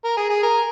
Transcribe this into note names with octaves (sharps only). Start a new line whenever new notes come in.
A#4
G#4
G#4
A#4